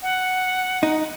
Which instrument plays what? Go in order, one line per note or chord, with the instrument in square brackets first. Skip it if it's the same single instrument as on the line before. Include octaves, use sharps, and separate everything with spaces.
[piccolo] F#5
[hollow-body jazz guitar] D#4